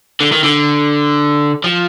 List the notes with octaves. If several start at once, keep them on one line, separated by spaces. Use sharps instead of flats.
D3
D#3
D3
F3